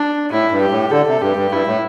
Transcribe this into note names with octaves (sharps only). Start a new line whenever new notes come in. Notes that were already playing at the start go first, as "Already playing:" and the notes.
Already playing: D4
A2 E4
G2
G4
A2
D3 A4
C3
G2 G4
G2
G2 E4
A2